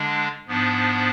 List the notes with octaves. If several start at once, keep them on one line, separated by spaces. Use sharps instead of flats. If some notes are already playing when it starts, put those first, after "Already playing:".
Already playing: D3 G#3 D4
G#2 F3 B3 D4